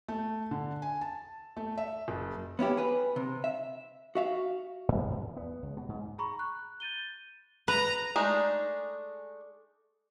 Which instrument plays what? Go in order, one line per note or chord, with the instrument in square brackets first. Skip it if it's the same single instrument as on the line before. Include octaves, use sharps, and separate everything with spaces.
[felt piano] A3
D3
G#5
A5
A3
E5
F#1
[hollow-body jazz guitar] B3 C#4 E4 G4
G#4 B4
C3
E5
F#4 E5 F5
[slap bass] G#2
E2
B3
C#2
B2
G#2
[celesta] G#4 A#5 B5 C#6
F#6
G6 A6 D#7 G7
[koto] B4 [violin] A#5
[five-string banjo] G#3 A3 D4 D#4 G#4